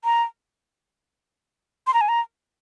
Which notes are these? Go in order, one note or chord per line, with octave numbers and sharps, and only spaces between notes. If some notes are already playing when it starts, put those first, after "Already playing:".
A#5
C6
A#5
G#5
A#5